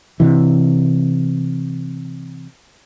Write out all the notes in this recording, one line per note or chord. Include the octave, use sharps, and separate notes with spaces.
C3 E3